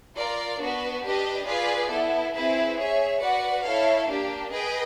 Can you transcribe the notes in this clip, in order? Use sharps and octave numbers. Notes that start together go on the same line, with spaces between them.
F4 A#4 D5
B3 D4 F#4 B4
D4 G4 B4 D#5
F4 G#4 B4 D5
B3 E4 A4
C4 E4 G#4 B4
G#4 C#5 E5
F#4 B4 D5 F#5
E4 A4 C#5 F5
A#3 D4 G4
G#4 B4 D#5 G5